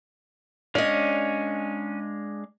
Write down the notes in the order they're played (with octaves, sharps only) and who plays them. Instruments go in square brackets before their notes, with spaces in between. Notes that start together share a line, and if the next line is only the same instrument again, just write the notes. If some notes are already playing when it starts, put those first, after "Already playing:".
[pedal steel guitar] G#3 D4 F5 [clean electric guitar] C#4 [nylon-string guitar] D5 D#5